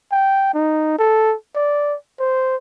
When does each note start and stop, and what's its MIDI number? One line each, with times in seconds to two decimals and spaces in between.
0.12 0.50 79
0.54 0.98 63
0.99 1.35 69
1.56 1.96 74
2.20 2.56 72